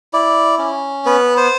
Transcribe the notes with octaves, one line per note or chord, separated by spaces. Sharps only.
E4 D5
C#4
B3 B4
C5